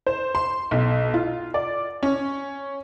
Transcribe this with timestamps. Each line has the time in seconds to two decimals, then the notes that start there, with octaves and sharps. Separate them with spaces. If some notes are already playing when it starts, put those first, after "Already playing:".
0.07 C5
0.35 C6
0.71 B1
1.14 F4
1.54 D5
2.03 C#4